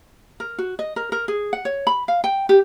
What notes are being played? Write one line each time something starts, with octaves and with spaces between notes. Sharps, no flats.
A#4
F#4
D#5
A#4
A#4
G#4
F#5
C#5
B5
F5
G5
G4